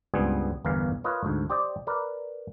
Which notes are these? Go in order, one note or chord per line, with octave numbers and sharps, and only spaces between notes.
C#2 G2 G3 B3 C4 G#4
G1 E2 G2 E3 A#4 F5
F4 A#4 B4 C#5 D#5 E5
D2 G#2
G4 C5 D5 D#5
A#4 B4 D5